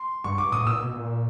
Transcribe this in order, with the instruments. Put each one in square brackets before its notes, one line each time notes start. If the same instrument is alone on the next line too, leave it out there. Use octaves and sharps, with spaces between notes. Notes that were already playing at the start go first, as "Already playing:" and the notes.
Already playing: [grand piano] C6
[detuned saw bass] G2 [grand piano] C#6
[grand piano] D6
[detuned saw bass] A2 [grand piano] D#6
[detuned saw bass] A#2 [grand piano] E6
[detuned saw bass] B2
A#2